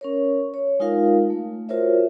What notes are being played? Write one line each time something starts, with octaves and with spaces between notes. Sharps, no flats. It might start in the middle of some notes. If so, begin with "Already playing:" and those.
C#4 A#4 C#5
C#5
G#3 D#4 F4 A#4 F5
A3
F4 F#4 A#4 C5 C#5 E5